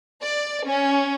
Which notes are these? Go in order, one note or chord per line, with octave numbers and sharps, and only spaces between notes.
D5
C#4